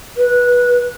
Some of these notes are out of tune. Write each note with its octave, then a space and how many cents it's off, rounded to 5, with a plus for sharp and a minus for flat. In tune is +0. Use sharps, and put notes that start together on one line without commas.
B4 -15